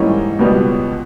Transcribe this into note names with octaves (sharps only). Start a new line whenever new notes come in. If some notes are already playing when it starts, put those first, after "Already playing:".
Already playing: G#2 E3 G3 A#3 C#4 C#5 D#5
C#2 B2 G3 B3